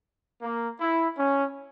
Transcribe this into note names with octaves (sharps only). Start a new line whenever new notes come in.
A#3
E4
C#4